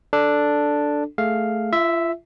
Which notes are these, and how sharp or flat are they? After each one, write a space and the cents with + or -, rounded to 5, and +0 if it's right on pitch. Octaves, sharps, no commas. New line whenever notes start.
D4 +0 A4 +0
A3 +0 G#4 +0 F5 +0
F4 -35 E5 +0